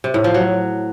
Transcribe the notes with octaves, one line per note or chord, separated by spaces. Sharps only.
C3
A2
F3
F#3